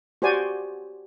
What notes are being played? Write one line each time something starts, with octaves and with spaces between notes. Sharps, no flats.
F#4 G4 C5 D5 G#5